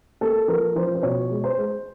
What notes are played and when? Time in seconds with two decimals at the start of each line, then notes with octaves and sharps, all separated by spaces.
0.21 A#3 A4
0.48 F3 A#4
0.76 F3 C5
0.95 C5
1.03 B2 C#5
1.30 G#3
1.44 C5
1.57 G#3